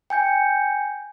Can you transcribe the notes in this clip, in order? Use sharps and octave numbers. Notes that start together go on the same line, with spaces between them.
G5 G#5 G6 C#7